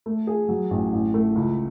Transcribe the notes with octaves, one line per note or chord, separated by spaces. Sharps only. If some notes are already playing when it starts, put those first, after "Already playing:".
A3
G#4
F#3
A1
A1
A3
C#2